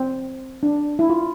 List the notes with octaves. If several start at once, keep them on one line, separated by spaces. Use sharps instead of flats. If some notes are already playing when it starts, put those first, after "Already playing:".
Already playing: C4
D4
E4
F4